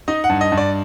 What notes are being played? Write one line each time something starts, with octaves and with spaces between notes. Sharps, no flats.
D#4 D#5
F#5
G2
D#5
G2
D5